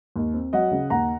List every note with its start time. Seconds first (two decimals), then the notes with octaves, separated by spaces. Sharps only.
0.16 D#2
0.34 C4
0.53 F#3 D#5 F#5
0.71 C#3
0.90 D#2 F#5 A#5